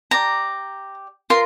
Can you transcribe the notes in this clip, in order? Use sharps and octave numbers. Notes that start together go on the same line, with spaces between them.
G4 D5 A#5
F4 A#4 C6